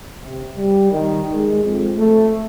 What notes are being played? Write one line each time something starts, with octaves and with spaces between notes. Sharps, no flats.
C3
G3
D#3
G#3
F2
A3